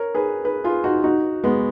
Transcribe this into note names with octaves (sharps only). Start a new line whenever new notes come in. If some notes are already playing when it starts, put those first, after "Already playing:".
Already playing: A#4 C#5
G#4 B4
G#4 B4
F4 G#4
D#4 F#4
D#4 F#4
G#3 B3